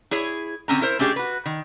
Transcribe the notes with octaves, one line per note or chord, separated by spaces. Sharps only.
E4 G#4 C#5
D3 C4 C#4 A#5
E4 A#4 C5
A3 C#4 D4 G4 G#4
F#4 B4
D#3